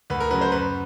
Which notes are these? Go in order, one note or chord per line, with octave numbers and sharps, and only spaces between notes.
D2 B4
A#4
C#3 F#3 B4
C5
F#2 B4